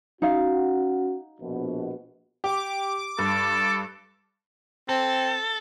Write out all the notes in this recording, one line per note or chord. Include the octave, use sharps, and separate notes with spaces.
C#4 D#4 F#4 F5
A#1 B2
G4 D6
G2 A4
C4 A4